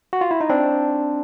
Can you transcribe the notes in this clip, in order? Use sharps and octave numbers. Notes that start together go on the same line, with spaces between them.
F#4
F4
E4
D#4
C4 D4